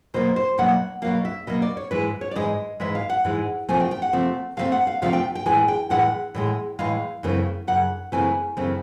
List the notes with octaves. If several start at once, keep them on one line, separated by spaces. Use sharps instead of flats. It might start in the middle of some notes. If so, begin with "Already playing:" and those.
B2 F#3 A#3 C5
C5
B2 F#3 A#3 F#5
B2 F#3 A#3 F5
E5
B2 F#3 A#3 D#5
D5
C#5
G#2 E3 G#3 B4
C#5
D5
G#2 E3 G#3 D#5
G#2 E3 G#3 E5
F5
F#5
G#2 E3 G#3
C3 F3 A3 C4 G#5
G5
G5
F#5
C3 F3 A3 C4
C3 F3 A3 C4 F5
F#5
F5
C3 F3 A3 C4 F5
G5
G5
A2 E3 G#3 G#5
G5
A2 E3 G#3 F#5
A2 E3 G#3
A2 E3 G#3 F5
F#2 C#3 E3 A3 C4
F#2 C#3 F#5
F#2 C#3 E3 A3 C4 G#5
F#2 C#3 E3 A3 C4